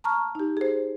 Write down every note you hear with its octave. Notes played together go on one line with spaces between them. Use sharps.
A5 A#5 C#6 F6
D#4 G4
G#4 C5